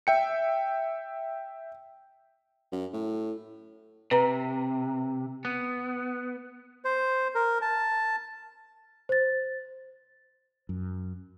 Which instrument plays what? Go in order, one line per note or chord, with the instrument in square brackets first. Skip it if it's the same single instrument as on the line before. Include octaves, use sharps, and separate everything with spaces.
[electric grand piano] E5 G5 C#7
[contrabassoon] F#2
A2
[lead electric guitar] C3 [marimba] B4 A#5
[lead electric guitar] B3
[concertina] C5
A#4
A5
[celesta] C5 A6
[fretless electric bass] F#2